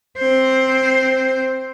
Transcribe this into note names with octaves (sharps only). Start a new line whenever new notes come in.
C4 C5